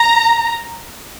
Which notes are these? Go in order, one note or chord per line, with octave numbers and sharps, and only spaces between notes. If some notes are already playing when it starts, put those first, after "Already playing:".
Already playing: A#5